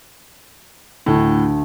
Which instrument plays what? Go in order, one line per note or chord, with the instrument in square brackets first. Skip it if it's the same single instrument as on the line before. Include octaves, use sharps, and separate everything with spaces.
[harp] D2 [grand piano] A2